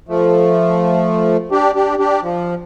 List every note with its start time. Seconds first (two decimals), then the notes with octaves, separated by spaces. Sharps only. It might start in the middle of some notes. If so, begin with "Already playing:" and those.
0.08 F3 A3
1.51 D4 G4
1.75 D4 G4
1.99 D4 G4
2.23 F3